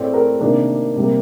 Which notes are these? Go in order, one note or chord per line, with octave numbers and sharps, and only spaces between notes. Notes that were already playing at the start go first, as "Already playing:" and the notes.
Already playing: A2 A3 C4 D5
A#4
C3 D#3 A#3 D4
C3 G3 A#3